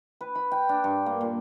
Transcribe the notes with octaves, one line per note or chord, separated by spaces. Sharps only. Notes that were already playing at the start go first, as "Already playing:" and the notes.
B4
B5
G5
D4
G2
A#3
A#2